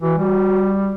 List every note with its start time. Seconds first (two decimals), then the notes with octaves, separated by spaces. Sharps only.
0.02 E3 F#4
0.18 G3 F#4